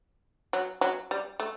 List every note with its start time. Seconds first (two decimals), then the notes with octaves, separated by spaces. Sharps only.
0.53 F#3
0.81 F#3
1.11 G3
1.40 A3